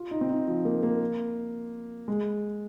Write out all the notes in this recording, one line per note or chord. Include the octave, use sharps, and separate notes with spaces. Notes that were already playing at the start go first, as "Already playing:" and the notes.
Already playing: F4
D#4
C4
D#4
F3
A#3
A#3
G#3